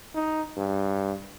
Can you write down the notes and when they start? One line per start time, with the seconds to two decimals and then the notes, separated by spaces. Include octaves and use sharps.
0.15 D#4
0.57 G2